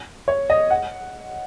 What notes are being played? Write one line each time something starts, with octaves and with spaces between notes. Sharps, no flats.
C#5
D#5
F#5